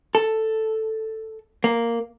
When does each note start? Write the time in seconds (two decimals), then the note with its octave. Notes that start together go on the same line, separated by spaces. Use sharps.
0.15 A4
1.64 A#3